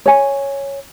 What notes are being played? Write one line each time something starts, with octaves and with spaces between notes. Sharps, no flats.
C#5 G#5